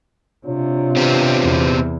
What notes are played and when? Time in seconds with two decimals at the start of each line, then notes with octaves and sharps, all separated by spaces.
0.46 C3 D4 F4 C#5
0.96 B3 C4 G4
1.43 E2 C3